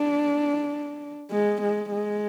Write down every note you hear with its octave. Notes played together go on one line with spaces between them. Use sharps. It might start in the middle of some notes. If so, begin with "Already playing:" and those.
Already playing: D4
G#3
G#3
G#3